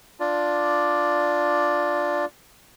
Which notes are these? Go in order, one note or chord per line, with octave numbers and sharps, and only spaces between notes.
D4 F4 D5